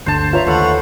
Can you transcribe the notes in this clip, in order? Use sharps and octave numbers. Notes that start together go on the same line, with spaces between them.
G1 D2 D3 C5 A5
F4 B4 C#5 E5 A#5
D#2 A3 F#5 B5 C#6